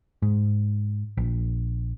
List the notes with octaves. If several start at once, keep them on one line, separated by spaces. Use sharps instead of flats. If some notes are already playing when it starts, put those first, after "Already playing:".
G#2
A#1